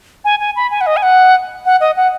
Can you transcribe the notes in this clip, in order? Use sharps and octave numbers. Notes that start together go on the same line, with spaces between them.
G#5
G#5
B5
G#5
F#5
D#5
G#5
F#5
F#5
D#5
F#5